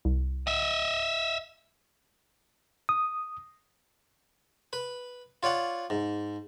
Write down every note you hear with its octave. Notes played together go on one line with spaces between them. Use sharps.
C2
D#5 E5
D#6
B4
F4 C#5 D5 F#5
G#2